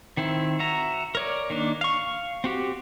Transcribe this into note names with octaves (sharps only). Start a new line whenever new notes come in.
D#3 C4 E4
F#4 E5 A#5
A#4 C#5 D5
D#3 A#3 D4
F5 C#6
C4 F#4 G4